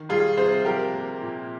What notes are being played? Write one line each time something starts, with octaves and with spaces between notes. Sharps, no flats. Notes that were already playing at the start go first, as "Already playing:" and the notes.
Already playing: D#3
G3 F4 G#4
C3 G#4 C5
F3 G4 A#4
A#3
A#2